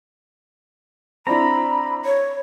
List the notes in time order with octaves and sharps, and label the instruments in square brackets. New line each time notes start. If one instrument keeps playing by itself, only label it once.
[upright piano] C4 D4 E4 [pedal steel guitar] A#5 [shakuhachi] B5
[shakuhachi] C#5